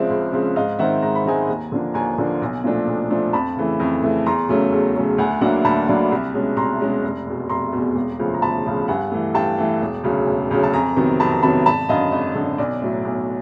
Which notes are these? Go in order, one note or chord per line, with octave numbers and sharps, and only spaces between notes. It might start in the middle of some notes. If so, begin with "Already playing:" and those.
Already playing: C#2 C#3 F3 G#3 C4 D5 E5
C#2
C#3 F3 G#3 C4
G#2 D#5 F5
D#3 G#3 C4 D#4 E5 F#5
G#2 A#5
B5
D#3 G#3 C4 D#4 G#5 A#5
D#2
D3 F3 A#3 D4
D#2 G#5 A#5
D3 F3 A#3 D4
B1
A#2 F3 A3 D4
B1
A#2 F3 A3 D4
F2 A5 B5
C#3 E3 A3
F2
C#3 E3 A3
E2 A#5 C6
C#3 F#3 A3 C#4
E2
C#3 F#3 A3 C#4
D2 F#5 G#5
D3 F#3 A#3 D4 E5 F#5
D2 A5 B5
D3 F#3 A#3 D4
C2
B2 G#3 C#4
C2 A#5 C6
B2 G#3 C#4
F1
E2 B2
F1 A#5 C6
E2 B2
E1
D2 C#3 F3
A#5
E1 A5 B5
D2 C#3 F3
G2 F#5 G#5
E3 A3
G2 G5 A5
E3 A3
E1
D2 C#3 F#3
E1
D2 C#3 F#3
A5
F2 G#5 A#5
C3 D#3 F#3 B3
F2 A5 B5
A#5
C3 D#3 F#3 B3 A5 B5
G#1 A5 B5
F#2 D3 D#5 F5
G#1 D#5
F#2 D3
B1 D5
A2 F#3
B1